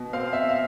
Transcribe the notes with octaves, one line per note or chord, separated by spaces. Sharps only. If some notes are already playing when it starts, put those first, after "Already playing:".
Already playing: B2
C4 F5
E5
F5